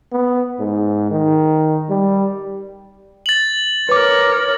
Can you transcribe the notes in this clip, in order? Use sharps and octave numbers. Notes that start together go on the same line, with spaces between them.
B3
G#2
D#3
G3
A6 F#7
A#4 B4 C#5 D6